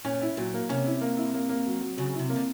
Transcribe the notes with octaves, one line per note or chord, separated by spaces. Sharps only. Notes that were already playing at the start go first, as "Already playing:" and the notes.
A#2 C#4
E4
A#2 F#3
A#3
C3 C#4
E4
A#3
E4
A#3
A#3
F#3
F#3
C#3 F#3
E4
C3
A#3
D3